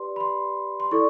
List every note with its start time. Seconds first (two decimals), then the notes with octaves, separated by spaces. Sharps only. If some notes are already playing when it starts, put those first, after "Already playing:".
Already playing: G4 B4 D5 C6
0.16 B5
0.20 C6
0.80 C6
0.91 E4 A4 D5 C#6